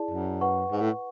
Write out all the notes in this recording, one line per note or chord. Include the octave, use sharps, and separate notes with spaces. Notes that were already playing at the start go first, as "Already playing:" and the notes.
Already playing: E4 G#4 D5 A5
F#2
B4 F#5 C#6
G#2
A2